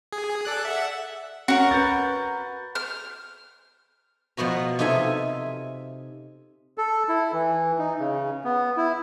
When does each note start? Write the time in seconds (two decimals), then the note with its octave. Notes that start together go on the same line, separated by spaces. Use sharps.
0.13 G#4
0.45 A4 D5 F#6
0.65 E5 F#5
1.48 C#4 F#4 A#4
1.71 B4 G6 A6
2.75 F6
4.37 B2 F3 B3 F#4 A#5
4.79 C3 D#4 F4 A4 E5 G#5
6.78 A4
7.09 E4
7.33 E3
7.79 D#4
7.99 C#3
8.44 B3
8.77 E4